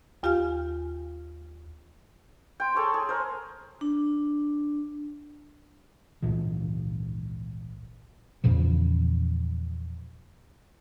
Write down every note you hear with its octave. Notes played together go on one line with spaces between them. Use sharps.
D#2 F4 G4 F5 G#5 F6
G5 C6
G#4 A4 C#5 C6
G#4
A#4 C5
D4
G#1 C#2 A#2 E3
E2 A#2 C#3 F3